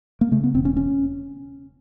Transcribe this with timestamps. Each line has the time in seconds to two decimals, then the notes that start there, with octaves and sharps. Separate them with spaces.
0.21 A#3
0.32 C#3 A3
0.44 B3
0.54 E1 C4
0.65 C#4
0.77 C#4